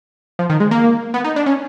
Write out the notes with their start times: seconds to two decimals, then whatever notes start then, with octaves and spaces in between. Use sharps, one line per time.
0.39 F3
0.50 D#3
0.60 G#3
0.71 A#3
1.14 B3
1.24 D#4
1.36 D4
1.46 C#4